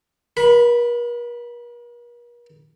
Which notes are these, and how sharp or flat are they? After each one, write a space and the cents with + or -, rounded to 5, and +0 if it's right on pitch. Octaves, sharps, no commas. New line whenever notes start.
A#4 +45 B5 +0